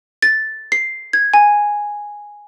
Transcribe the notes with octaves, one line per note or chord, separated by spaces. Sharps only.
A6
C7
G#6
G#5